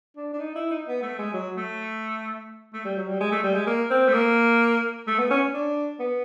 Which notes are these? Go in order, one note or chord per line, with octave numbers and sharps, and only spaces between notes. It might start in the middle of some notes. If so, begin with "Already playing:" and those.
D4
D4
D#4
E4
D#4
B3
A3
G#3
F#3
A3
A3
G3
F#3
G3
G#3
A3
G3
G#3
A#3
C4
A3
A#3
A3
B3
C#4
D4
B3